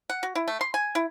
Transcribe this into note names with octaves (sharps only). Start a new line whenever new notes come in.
F#5
F#4
E4
A3
C6
G#5
E4